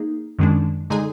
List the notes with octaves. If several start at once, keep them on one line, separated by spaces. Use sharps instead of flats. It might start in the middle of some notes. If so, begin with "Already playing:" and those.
Already playing: A#3 D#4 G#4
F#2 D#3 G#3 D4
D3 G#3 D#4 G#4